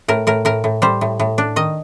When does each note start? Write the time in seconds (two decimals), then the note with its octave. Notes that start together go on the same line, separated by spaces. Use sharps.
0.08 A2 A#4
0.27 A2 A#4
0.45 A2 A#4
0.64 A2
0.82 G3 C5
1.01 A2
1.20 A2
1.38 D4
1.56 D#3 D#5